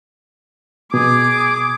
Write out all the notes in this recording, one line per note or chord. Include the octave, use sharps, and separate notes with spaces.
B2 G#4 D6